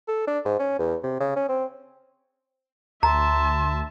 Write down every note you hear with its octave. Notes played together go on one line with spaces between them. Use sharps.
A4
D4
G#2
C#4
E2
C3
C#3
C#4
C4
D2 E5 A5 A#5 C6